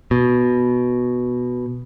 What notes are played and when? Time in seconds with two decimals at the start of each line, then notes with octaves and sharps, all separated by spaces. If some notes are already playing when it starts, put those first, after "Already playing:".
0.11 B2